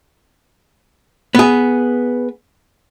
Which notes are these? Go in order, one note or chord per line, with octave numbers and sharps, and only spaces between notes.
B3 G#4